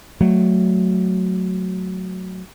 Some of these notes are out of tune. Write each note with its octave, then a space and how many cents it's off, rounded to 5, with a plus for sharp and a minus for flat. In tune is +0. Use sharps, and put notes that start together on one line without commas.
F#3 +0 A3 +0